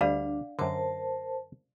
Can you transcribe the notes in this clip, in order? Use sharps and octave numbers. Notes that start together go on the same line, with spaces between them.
D2 G3 D4 D5 D#5 F5 F#5
F#2 D3 A#4 C5 A5